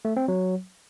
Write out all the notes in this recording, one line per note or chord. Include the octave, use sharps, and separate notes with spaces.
A3
C4
F#3